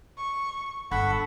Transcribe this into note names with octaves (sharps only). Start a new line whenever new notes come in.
C#6
G1 A4 F#5 B5 C#6